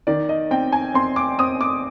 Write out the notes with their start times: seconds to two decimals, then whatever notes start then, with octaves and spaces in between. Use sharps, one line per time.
0.07 D#3 D5
0.29 D#5
0.51 C4 G5
0.72 G#5
0.94 C4 C6
1.16 D6
1.39 C4 D#6
1.61 D6